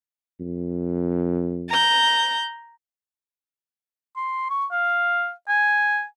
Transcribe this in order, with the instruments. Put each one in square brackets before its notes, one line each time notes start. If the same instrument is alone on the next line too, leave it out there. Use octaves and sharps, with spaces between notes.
[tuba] F2
[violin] A#5 G6
[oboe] C6
C#6
F5
G#5